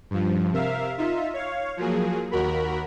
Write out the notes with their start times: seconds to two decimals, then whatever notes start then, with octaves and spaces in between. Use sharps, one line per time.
0.10 G2 F3
0.52 C3 A#4 E5 F5
0.98 D#4 F4 E5
1.34 C#5 F5
1.77 F3 F#3 A#3 G#4
2.31 D#2 F#4 A#4 B5